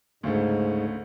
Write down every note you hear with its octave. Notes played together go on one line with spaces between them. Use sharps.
D2 G#2 C#3 A3